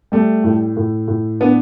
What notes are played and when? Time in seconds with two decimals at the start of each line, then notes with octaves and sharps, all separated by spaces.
0.12 G3 A3
0.44 A2
0.76 A2
1.08 A2
1.40 B3 D4